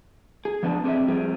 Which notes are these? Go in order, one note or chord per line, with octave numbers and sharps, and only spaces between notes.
G#4
F3 B3 D4 B4 D#5 A5
C4 D4 G#4 C#5 D#5 E5
F3 G3 C4 F4 G#4